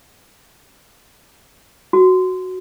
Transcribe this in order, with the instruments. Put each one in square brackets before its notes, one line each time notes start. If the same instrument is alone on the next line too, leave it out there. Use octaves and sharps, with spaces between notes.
[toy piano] F#4